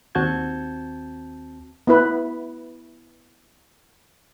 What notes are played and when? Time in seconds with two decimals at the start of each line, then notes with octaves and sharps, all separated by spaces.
0.15 D#2 C4 F#4 A5 G6 G#6
1.87 B3 E4 B4